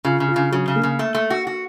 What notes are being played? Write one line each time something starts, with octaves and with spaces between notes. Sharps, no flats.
C#3 F4
C#3
F4
C#3
C#3 F#3
C#3
A#3
C#3
A3
A3
F#4
F#4